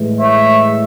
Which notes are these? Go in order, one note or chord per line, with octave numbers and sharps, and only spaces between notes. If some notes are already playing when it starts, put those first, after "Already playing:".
Already playing: A2 E3 G#3
C#5 E5